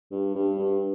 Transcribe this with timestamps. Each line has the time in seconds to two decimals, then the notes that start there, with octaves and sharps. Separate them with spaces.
0.11 G2
0.35 G2
0.59 G2